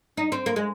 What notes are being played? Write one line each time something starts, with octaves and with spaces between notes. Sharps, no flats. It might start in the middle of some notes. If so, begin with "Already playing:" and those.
D#4
C4
A#3
G#3